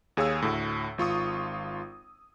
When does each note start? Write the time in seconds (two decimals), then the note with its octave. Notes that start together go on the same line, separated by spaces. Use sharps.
0.17 D#2 G#4 C#5 F5 E6
0.42 D2 A2
0.98 G#1 F4 C#6 D#6